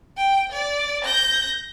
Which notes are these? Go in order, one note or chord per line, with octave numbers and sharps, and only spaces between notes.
G5
D5
G6 A#6